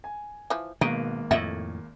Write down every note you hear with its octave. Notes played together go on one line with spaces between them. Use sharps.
G#5
E3 F3
G#1 B2 A#3 D#4
F2 A2 D#5 E5 F#5